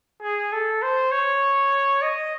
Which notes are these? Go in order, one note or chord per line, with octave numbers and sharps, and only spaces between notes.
G#4
A4
C5
C#5
D#5